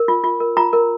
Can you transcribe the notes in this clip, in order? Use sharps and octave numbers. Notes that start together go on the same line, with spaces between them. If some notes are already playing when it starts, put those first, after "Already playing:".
Already playing: A#4
F4
F4
A#4
F4 A#5
A#4